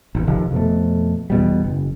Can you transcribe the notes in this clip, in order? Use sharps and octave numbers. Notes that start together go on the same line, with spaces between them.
G#1 E2
F1 C3 D#3 F3
F2 B2 A3
E2 B2 G3
F#1